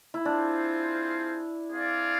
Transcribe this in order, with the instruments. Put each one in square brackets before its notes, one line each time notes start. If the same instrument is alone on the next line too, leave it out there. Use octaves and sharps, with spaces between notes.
[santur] E4
[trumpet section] C4 F4 G#4 C5 [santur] D4
[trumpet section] C4 G#4 D5 F5